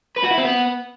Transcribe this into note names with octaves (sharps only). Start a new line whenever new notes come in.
B4
F#4
E4
C4
B3